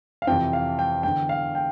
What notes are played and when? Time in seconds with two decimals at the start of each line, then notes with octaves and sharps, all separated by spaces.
0.22 F5
0.27 F2 C3 E3 G5
0.53 F5
0.79 G5
1.03 E2 D3 G5
1.29 F5
1.55 G5